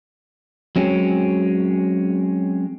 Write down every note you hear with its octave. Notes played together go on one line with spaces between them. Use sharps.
F#3 G#3 C4 C#4